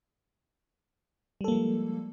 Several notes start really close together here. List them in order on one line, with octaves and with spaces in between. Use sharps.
G3 A4 A#3 F3 G#3